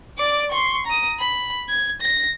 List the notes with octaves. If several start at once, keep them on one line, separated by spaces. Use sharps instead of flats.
D5 D6
C6 C#6
A#5 D#6
B5
G#6
A#6